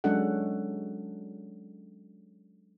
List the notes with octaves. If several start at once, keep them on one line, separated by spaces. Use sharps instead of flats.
F#3 G#3 C#4 D4 A4 F#5